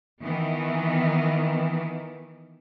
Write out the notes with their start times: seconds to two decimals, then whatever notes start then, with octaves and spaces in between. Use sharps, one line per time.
0.21 D#3 E3 B3